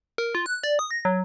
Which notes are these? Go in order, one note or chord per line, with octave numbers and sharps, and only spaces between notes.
A#4
F4
F#6
D5
D#6
A#6
F#3